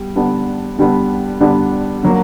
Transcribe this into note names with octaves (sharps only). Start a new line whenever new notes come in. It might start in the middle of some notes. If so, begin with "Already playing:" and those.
Already playing: G3 B3
D3 G3 B3 D4
D3 G3 B3 D4
D3 G3 B3 D4
D3 F#3 A#3